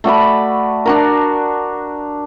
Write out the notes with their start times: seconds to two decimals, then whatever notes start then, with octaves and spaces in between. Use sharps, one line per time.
0.04 A3 F#4 D5 B5
0.86 D4 F#4 A#4